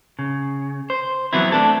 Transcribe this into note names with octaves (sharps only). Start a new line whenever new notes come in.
C#3
C5
E3 F#3 B3 C4 E4
A3 D4 A4